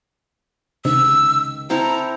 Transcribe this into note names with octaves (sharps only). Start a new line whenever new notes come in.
C#2 C3 D#3 E6
C4 E4 A4 A#5